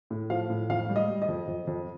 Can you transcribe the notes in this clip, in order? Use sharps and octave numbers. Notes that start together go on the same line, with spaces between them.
A2
F3 F5
A2
F2 F5
G3
D#5
G3
D#5
F2
F2
F2